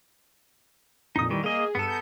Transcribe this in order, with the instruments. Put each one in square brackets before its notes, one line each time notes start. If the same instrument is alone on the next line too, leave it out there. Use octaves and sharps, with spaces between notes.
[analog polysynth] F2 A#2 [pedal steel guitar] D#4 D#6
[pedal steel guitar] D#3 E3 [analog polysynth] G3
[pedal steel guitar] A#3 D#5 [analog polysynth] G#4
[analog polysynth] G2 D#7 [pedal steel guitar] B3 A4
[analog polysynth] G#5 A#5 G6